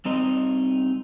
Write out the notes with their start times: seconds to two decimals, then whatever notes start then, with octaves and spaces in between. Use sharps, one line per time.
0.05 G3 C4 D#4 D#5